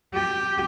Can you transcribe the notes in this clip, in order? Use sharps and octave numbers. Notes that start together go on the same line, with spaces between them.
G4